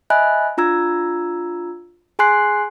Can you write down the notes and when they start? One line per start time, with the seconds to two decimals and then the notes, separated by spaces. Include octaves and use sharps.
0.10 D#5 E5 G#5 B5 F#6
0.58 D4 F4 A#5 E6 G#6
2.19 G#4 G#5 C6 F#6 C7